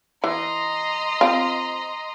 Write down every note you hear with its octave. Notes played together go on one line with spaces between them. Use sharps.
E3 D#5 A#5 C6
C4 F4